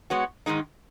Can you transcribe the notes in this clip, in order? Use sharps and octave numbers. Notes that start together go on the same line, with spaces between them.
G#3 B3 F#4 C#5
G#2 D#3 G#3 D#4